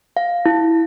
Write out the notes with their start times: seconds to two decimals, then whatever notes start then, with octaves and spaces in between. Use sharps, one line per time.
0.17 F5
0.46 E4